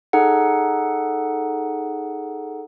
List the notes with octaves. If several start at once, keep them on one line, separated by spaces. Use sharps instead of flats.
D#4 G#4 A4 F#5